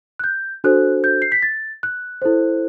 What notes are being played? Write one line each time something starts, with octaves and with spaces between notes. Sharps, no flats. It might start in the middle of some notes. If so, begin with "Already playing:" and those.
F#6
G6
D4 F#4 A4 C5 F#6
G6
C7
B6
A6
F#6
E4 A4 C5